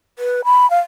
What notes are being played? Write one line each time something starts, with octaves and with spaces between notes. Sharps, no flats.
B4
B5
F5